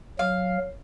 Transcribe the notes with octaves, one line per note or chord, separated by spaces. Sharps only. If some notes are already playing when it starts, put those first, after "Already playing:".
F#3 F5